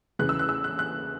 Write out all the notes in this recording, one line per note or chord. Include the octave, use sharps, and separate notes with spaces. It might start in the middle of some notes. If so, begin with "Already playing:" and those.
E2 C#3 E3 F#6
E6
F#6
E6
F#6
F#6